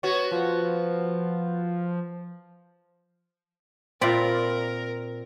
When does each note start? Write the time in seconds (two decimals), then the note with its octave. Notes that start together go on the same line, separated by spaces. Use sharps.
0.03 B3 F#4 C#5
0.32 F3
4.01 A#2 C4 F4 A#4 D5 B5